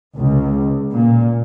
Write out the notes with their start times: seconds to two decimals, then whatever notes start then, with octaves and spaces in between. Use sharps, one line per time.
0.17 C#2
0.93 A#2